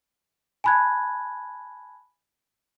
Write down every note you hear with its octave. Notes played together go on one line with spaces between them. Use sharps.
G#5 A5 B5 F#6 G#6